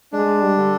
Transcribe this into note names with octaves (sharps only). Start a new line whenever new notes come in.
G#3 D4
G3
D3